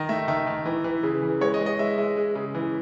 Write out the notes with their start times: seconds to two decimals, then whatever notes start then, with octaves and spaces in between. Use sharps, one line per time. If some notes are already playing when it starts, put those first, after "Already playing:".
Already playing: D#3 D#5
0.09 A3 E5
0.28 D#3 E5
0.47 D#3
0.65 E3
0.84 E3
1.03 C#3
1.22 E3
1.41 G#3 C#5
1.54 D#5
1.60 G#3
1.66 D#5
1.79 G#3 E5
1.98 G#3 E5
2.17 G#3
2.35 C#3
2.55 E3